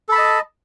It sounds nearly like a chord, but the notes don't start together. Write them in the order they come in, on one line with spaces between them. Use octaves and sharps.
A4 B5 A5 D#5